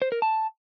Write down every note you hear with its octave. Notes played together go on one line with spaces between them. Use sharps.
C5
A#4
A5